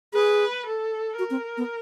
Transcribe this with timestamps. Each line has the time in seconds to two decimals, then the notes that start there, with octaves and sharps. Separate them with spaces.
0.13 G#4 B4
0.66 A4
1.18 F#4 A#4
1.31 C4
1.57 B3